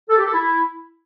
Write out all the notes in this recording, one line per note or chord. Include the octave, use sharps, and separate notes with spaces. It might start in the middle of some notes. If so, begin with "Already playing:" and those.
A4
G4
A4
E4